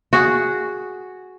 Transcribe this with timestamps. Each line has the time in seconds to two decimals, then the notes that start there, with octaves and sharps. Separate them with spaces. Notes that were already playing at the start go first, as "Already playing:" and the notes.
0.13 F#4 G#4